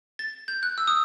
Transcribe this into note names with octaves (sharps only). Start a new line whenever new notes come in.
A6
G6
F#6
E6
D#6